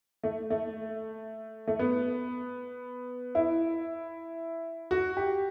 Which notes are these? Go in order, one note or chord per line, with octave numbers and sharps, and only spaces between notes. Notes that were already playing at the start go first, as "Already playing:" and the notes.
A3
A3
A3
B3
E4
F#4
G4